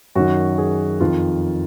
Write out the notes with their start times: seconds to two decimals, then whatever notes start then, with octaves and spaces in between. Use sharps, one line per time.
0.15 F#2 D#3 F#4
0.58 G#4
1.00 F2 D#3 F4